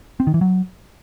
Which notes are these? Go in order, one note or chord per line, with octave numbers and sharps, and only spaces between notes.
C4
D#3
E3
F#3